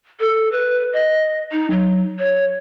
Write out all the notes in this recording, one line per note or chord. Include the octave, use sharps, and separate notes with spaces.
A4
B4
D#5
D#4
F#3
C#5